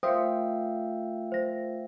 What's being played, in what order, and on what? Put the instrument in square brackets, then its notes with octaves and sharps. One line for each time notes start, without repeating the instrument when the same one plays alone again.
[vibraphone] A3 F4 A#4 [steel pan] C5 [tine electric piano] E5 F5 G5 [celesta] D#6
[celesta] C5 A#6